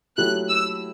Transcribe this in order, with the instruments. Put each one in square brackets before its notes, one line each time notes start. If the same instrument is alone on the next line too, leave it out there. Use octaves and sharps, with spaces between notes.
[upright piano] F#3 A3 E4 G4 [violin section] F#6
[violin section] E6